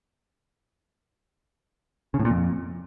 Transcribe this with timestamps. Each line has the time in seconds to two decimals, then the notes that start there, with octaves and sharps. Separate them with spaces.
2.14 C#3
2.20 A2
2.25 A#2
2.30 F2